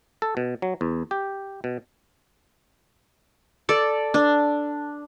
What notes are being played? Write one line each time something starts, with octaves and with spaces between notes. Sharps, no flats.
A4
B2
F#3
E2
G4
B2
A4 D5
D4